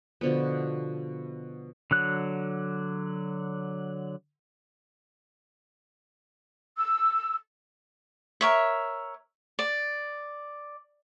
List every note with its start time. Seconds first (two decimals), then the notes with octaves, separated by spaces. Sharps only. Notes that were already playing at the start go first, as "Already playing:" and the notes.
0.21 B2 D3 F3 B3
1.91 D3 F#3 F#6
6.78 E6
8.41 A#4 C#5 E5
9.59 D5